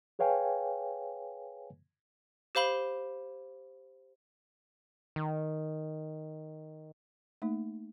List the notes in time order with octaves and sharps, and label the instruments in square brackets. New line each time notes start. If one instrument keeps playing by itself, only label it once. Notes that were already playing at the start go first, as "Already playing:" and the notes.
[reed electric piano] G#4 B4 C#5 F5 G5 G#5
[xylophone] G4 C5 F5 B5 G7
[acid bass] D#3
[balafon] A3 A#3 D#4